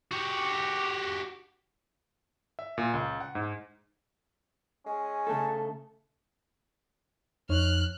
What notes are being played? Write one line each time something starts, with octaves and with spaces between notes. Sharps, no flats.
F#4 G4
E5
A#2
C#2
F#5
G#2
G#3 C#4
C#3 A3 A4 A5
F2 D#4 C#5 F6 F#6